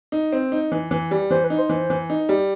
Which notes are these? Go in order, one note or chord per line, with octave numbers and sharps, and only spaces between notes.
D#4
C4
D#4
E3
E3
G3
E3 C5
B4
D#4
C5
E3
E3
D#4
G3